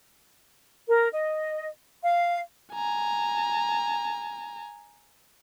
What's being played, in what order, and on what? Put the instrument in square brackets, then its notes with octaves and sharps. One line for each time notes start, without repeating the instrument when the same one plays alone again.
[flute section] A#4
D#5
F5
[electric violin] G#5 A#5